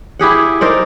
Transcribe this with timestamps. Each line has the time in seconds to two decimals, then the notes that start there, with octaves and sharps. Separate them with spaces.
0.19 E4 G4 G#4 F#5
0.61 D#4 A#4 C5 D5